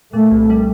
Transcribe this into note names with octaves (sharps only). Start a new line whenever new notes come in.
A#2 A3
C2
G3